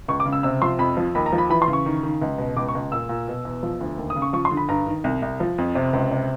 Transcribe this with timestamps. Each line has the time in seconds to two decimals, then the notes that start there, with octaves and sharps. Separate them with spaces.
0.08 C#2 C#6
0.20 D6
0.25 C#3
0.33 E6
0.43 C3 E6
0.62 F3 C6
0.79 F2 B5
0.97 F3
1.15 D#2 B5
1.26 A#5
1.33 F3
1.38 B5
1.50 E3 B5
1.62 C6
1.68 C#3
1.73 C#6
1.86 D#3
2.03 D#3
2.21 C#2
2.38 B2
2.57 C#2 D6
2.68 C#6
2.75 C#2
2.92 A#2 E6
3.09 A#2
3.28 B2
3.45 E2
3.63 F3
3.81 D2
3.98 D#2
4.10 D#6
4.16 C#3
4.22 C#6
4.33 F3 C#6
4.45 C6
4.51 D3
4.57 B5
4.69 G2 A#5
4.87 D#3
5.04 C2
5.22 C2
5.40 F3
5.58 F2
5.75 C3
5.93 C#2
6.11 C3